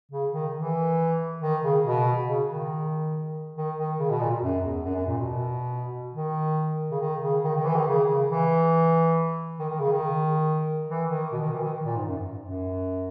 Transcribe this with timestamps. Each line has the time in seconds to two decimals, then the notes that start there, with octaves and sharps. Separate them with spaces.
0.11 C#3
0.32 D#3
0.54 E3
1.41 D#3
1.63 C#3
1.84 B2
2.27 C#3
2.47 D#3
3.56 D#3
3.77 D#3
3.99 C#3
4.10 B2
4.20 A#2
4.41 F#2
4.63 E2
4.85 F#2
4.95 F#2
5.07 A#2
5.18 B2
6.14 D#3
6.91 C#3
7.01 D#3
7.22 C#3
7.44 D#3
7.55 D#3
7.65 E3
7.75 D#3
7.87 C#3
8.08 C#3
8.30 E3
9.59 D#3
9.69 D#3
9.80 C#3
9.92 D#3
10.88 E3
11.09 D#3
11.32 B2
11.42 D#3
11.53 E3
11.64 D#3
11.85 A#2
11.96 G#2
12.07 F#2
12.39 F#2